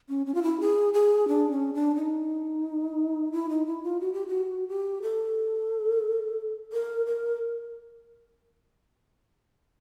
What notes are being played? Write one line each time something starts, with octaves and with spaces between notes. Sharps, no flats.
C#4
C#4
F4
E4
G#4
G#4
D4
C#4
D4
D#4
E4
D#4
E4
F4
F#4
G4
F#4
G4
A4
A#4
A#4